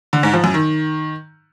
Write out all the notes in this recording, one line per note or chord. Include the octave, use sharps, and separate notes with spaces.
D3
G#2
F3
F#2
D#3